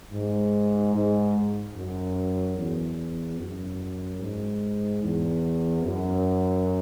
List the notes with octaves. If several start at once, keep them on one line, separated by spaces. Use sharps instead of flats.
G#2
G#2
F#2
E2
F#2
G#2
E2
F#2